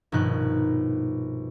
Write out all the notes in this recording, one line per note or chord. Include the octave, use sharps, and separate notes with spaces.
A#1 G2 B2 D#3 D#4 F#6